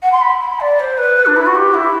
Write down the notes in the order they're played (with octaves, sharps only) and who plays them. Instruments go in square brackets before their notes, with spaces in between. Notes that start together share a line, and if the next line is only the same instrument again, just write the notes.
[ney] F#5
C6
B5
B5
D5
C5
B4
D4
E4
F#4
G4
E4